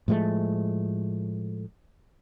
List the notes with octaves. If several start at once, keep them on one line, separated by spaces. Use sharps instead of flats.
A2 F3 G#3 A3